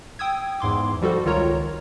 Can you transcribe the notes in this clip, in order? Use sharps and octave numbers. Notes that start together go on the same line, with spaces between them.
G5 D#6 E6 G#6
E2 G#2 C6 D6
F3 G3 F#4 A4 C5
C#2 D#3 F4 A#4 C#5 A#5